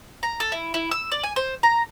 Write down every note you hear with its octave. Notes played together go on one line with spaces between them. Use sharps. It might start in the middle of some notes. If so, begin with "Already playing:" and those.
A#5
A4
E4
E4
E6
D5
G#5
C5
A#5